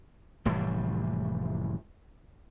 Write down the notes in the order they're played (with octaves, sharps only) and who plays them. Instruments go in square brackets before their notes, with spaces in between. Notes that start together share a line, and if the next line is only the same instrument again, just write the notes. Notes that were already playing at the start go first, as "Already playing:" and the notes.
[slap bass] F1 A2 E3 G3